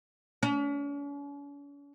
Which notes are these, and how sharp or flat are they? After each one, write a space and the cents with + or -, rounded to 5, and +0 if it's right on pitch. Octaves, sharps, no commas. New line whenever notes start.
C#4 +45